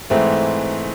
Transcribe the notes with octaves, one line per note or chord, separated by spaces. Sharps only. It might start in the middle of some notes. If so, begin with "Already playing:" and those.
G#2 E3 A3 C4